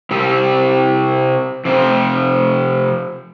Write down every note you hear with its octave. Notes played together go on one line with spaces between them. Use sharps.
C3 G3 C4
C3 F3 C4